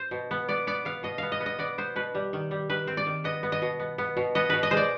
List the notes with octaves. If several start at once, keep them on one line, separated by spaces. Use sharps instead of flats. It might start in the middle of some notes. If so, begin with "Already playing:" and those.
Already playing: C5
B2
B3
B3 D5
B3 D5
B3 F5
B2 D#5
B3 F5
D#5
B3
D#5
B3 D5
B3 C5
B2 B4
G3
D#3
G3
D#3 B4
C4
D5
D#3
B3 D#5
B3
D#5
B2
B3
B3
B2
B3 D#5
B2 B4
D#5
G#3 C5
D5